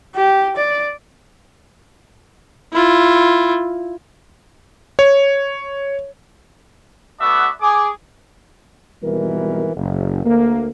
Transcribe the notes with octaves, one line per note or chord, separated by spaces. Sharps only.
G4
D5
E4 F4
C#5
A3 B3 F#4 D5 E5 F#5
G#4 D6
G#1 B2 E3 G3 A#4
F#1
D2 A#3